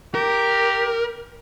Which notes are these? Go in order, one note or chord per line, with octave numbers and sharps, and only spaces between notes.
G4 A#4